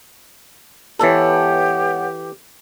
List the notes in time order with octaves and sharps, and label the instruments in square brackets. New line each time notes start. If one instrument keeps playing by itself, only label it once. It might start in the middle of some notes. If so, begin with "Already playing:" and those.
[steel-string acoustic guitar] G#2 B3 C#5 [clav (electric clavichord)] E3 A4 [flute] G4